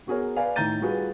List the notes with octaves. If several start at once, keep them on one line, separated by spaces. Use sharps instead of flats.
B3 F#4 G#4 A#4 C#5
B4 D5 F5 G#5
A2 D#3 A#5 G6 A6 D#7
G3 F4 F#4 G#4 B4